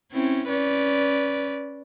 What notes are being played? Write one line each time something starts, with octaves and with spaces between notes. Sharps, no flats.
C4 C#4 E4
C#4 B4 D5